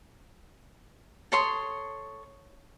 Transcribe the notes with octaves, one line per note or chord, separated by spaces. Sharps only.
A4 C#5 C6 D#6